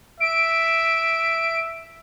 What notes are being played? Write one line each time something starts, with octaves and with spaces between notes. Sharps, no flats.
E5 D7